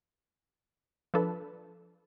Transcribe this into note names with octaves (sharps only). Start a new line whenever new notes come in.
F3 D4 A4 B4